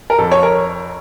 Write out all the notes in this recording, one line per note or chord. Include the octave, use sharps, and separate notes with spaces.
A#4
F2 A4
C#5
A#4